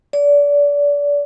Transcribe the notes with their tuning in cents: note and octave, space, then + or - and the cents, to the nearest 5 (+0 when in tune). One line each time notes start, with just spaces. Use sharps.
D5 -30